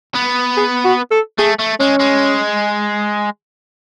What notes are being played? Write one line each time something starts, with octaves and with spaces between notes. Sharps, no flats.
B3
G#4
F#4
A4
A3 G#4
A3
G#3 C#4
G#3